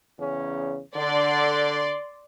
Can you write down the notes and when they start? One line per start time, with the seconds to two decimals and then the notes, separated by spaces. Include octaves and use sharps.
0.19 E2 C#3 C#4
0.96 D3 D5 C6